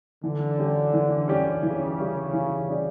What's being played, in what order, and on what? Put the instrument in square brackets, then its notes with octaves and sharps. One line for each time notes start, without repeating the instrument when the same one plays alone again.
[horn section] D3 [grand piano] E3
[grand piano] G3 C#4 G4 D5
E3
G3 C#4 G4 D5
[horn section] C#3 [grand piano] E3
[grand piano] G3 C#4 G4 D5
E3
G3 C#4 G4 D5